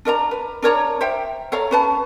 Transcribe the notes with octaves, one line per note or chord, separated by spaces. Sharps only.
D4 A#4 D#5 A#5
B4
D4 A#4 C#5 A#5
C5 E5 G5
A4 C#5 F5 A#5
C#4 B4 A5